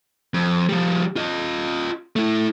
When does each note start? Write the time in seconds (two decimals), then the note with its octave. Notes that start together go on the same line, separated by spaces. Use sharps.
0.34 F2
0.69 F3 G3
1.16 F4 D#5
2.16 A3 E4